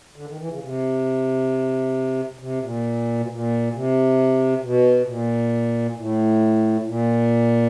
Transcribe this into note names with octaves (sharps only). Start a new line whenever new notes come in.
D3
D#3
E3
C#3
C3
C3
A#2
B2
A#2
C3
B2
A#2
A2
A#2